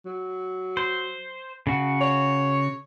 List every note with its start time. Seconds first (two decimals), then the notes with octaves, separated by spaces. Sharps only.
0.05 F#3
0.77 C5
1.67 C#3 F#4
2.01 C#5